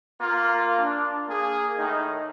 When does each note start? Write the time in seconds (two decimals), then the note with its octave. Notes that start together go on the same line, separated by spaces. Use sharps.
0.20 A#3 F4
0.78 D4
1.28 A#3 G#4
1.77 A2 D#3 D#4